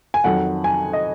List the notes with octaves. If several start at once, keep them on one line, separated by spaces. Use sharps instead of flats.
G#5
F2 D#3 F#3 F#5
G#5
D#5